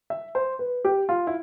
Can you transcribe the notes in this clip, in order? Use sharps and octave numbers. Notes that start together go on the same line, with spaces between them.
E5
C5
B4
G4
F4
E4